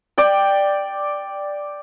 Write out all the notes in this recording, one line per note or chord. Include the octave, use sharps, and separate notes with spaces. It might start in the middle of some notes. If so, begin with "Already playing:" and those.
D5 G5